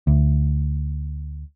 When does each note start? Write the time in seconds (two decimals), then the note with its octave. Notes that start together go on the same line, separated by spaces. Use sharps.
0.07 D2